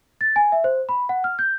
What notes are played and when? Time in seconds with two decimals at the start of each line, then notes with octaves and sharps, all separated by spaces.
0.21 A6
0.36 G#5
0.52 E5
0.64 C5
0.89 B5
1.09 F#5
1.24 F6
1.39 G6